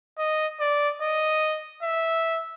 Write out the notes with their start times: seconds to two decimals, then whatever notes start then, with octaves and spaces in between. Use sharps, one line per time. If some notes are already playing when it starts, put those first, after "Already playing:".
0.18 D#5
0.60 D5
1.01 D#5
1.83 E5